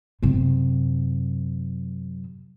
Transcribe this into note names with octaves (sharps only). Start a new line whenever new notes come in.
F#2 C3